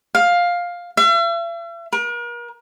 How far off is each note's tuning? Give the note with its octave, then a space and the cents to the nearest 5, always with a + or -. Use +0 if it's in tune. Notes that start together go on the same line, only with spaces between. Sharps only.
F5 +10
E5 +45
A#4 +40